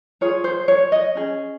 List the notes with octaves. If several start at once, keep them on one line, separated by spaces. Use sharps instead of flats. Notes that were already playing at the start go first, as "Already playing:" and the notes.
F4 G#4 C#5
C5
C#5
D#5
C#4 G#4